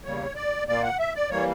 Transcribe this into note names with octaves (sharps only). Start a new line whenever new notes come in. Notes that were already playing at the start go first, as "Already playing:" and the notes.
E2 C#3 G3 A#3 C#5
D5
A#2 A#3 D5
F#5
E5
D5
E3 G3 A#3 C#5